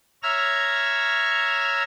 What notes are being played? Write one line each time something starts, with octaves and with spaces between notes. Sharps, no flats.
C#5 E5 A#5 E6 F6 G#6